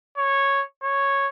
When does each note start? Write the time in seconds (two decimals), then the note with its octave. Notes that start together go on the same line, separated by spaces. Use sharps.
0.18 C#5
0.83 C#5